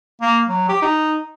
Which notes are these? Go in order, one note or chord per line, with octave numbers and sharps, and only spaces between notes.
A#3
F#3
G4
D#4